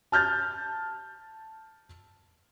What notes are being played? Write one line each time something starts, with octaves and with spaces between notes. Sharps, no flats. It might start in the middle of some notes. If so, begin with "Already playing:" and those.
A5 F6 G6 A6